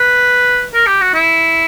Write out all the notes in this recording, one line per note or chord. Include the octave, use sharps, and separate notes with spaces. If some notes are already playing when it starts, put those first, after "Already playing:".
Already playing: B4
A#4
G4
F#4
E4